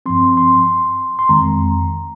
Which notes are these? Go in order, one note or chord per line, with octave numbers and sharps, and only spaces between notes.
G2 F3 C4 C6
C6
C6
F2 D#3 G#3 C4 A#5